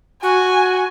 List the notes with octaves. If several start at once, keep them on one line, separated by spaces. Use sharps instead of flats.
F#4 G#5